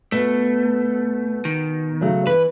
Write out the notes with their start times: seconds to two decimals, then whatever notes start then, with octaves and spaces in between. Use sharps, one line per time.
0.12 B2 A3
1.45 D#3
2.01 C#3 F#3 A3
2.27 E3 B4